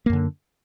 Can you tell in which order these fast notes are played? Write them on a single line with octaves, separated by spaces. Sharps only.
A#3 F#2 D3